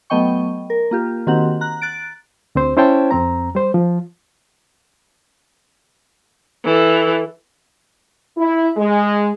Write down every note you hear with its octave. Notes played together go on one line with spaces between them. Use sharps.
F#3 A3 B3 D#5 G5 C#6
A#4
A#3 F4 G4
D#3 A#3 C4 F#4 G4 F#5
A#5 F#6
F#6 A6 D7
D2 C4 C5
C#4 E4 C5 C#5 G5 A5
F2 C4 A#5
G3 C5
F3
E3 A4
E4
G#3